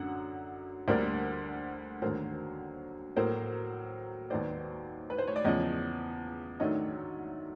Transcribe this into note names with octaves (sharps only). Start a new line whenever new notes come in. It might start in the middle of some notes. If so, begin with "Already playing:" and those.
Already playing: F#2 D3 F#3 F#5
D2 D3 G3 A#3 D4 A#4 C5
D#2 D3 F#3 A#4 C5
A2 F#3 A#3 A#4 C5
D#2 D#3 F#3 B3 C5 D5
B4
C5
C#5
D5
E2 C#3 F3 C#5 D#5
G#2 D#3 F#3 A3 D4 C#5 D#5